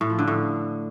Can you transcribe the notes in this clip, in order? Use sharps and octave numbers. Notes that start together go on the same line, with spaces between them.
A2
F3
D3
A2